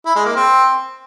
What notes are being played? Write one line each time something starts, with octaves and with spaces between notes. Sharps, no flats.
E4
G#3
A#3
C4